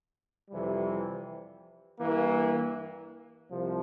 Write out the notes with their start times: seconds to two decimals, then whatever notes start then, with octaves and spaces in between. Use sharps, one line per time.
0.49 F2 C3 E3 G3
1.99 G2 E3 A#3
3.49 C2 C3 F3